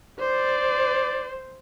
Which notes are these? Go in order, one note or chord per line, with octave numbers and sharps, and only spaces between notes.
C5 D5